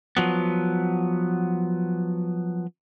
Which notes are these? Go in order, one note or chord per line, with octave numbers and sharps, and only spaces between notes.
F3 F#3 B3